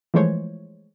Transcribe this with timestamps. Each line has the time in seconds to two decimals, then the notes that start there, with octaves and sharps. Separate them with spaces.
0.14 E3 F3 G#3 A3 C5 C#5